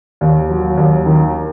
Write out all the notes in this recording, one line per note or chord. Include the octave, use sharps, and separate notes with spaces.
D#2
F#3
D#2
D#3